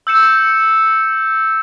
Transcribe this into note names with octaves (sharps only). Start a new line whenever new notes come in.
E6 G6 C#7 E7